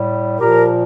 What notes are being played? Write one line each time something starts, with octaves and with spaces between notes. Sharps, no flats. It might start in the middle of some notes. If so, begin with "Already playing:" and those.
Already playing: A2 G3
A#2 F3 G4 A#4